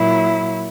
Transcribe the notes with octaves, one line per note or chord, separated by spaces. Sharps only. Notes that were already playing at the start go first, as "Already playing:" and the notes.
Already playing: A#2 F#3 E4